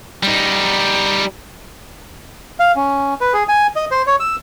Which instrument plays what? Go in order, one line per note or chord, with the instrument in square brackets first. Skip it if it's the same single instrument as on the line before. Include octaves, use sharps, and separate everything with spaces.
[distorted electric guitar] G3 D#4
[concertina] F5
C#4
B4
G#4
G#5
D#5
C5
C#5
E6